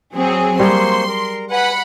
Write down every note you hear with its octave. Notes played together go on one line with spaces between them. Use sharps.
F#3 C4 G#4
G3 A#3 G#4 C5 C6 C#6
A#4
B4 F#5 G#5 B5